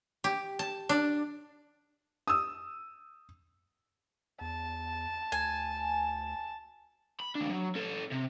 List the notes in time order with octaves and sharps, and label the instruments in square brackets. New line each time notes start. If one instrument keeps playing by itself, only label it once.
[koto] G4
A5
D4
[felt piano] D#6 E6
[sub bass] E2 [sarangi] A5
[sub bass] D2 [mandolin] G#5
[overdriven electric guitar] B5
D#2 D4
F#3
C#4 A4
C3